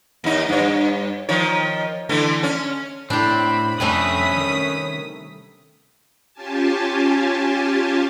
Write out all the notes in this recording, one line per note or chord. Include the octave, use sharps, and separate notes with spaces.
D#2 D#4
G2 C#5
D#3 F3 C#5
D3 E3 A3
C#4
A2 C4 D4 G4 B5
F2 C3 G3 A3 C#4 B4 D#6 B6
D#3
C#4 F4 G4 G#5 A5